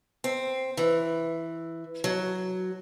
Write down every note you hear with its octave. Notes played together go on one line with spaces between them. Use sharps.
C4
E3
F#3